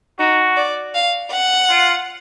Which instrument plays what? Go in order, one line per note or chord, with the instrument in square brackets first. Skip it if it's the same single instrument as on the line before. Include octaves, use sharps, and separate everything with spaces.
[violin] D#4 [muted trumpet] F#4
[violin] D5
F5
F#5
[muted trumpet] F4